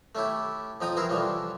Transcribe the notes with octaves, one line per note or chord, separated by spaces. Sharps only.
A3 C#4 E4 G4
F2 F3 D#4 G5 A#5 D#6
E3 C4 E4 G#4 A#4
D3 E3 F3 G3 C#4